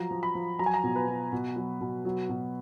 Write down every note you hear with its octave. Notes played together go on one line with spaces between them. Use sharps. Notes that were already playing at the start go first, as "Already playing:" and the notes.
Already playing: F3 F#3 A#5
F3
B5
F3
F#3 A#5
G#5
A#5
B2
B4
B2
B2
F#3
B2
F#3
B2